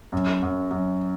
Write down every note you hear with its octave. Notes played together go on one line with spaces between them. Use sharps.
F#2
F#2
F#2